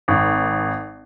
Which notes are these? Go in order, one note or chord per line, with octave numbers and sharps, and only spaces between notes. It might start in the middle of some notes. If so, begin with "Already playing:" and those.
G#1